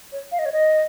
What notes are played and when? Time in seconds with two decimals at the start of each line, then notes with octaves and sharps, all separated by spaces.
0.12 C#5
0.32 F5
0.39 D#5
0.45 C#5
0.52 D#5